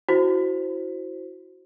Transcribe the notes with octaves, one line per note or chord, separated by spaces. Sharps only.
E4 F#4 C5